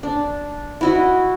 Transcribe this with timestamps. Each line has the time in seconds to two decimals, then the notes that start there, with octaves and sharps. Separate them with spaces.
0.03 D4
0.81 E4 F#4 D#5